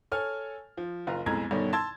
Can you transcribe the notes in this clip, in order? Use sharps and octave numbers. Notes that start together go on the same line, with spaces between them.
A4 C#5 G#5 F6
F3
F#1 F4 A#5
B1 F2 A2 G#3 A#5 G#6
G2 B2 D3 D#3 C#4
A5 C6 E6 G#6 A6